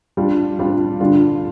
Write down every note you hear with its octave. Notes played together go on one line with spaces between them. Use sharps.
G3 D4 F4
G3 D4 F4
D3 G3 D4 F4